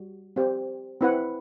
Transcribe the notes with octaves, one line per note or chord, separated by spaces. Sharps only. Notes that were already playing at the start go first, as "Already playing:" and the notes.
Already playing: G3 F#4
C4 G4 C5
C4 E4 B4 F#5